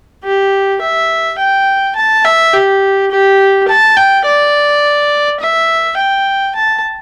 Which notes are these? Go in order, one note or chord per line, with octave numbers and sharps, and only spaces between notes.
G4
E5
G5
A5
E5
G4
G4
A5
G5
D5
E5
G5
A5